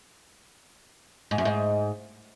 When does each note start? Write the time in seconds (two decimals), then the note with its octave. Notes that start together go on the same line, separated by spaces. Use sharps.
1.31 G#2
1.38 F#2
1.45 G#2